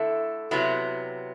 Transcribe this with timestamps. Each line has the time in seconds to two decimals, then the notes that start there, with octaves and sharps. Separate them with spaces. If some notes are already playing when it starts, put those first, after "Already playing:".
Already playing: D3 A3 E4
0.51 C3 F#3 B3 E4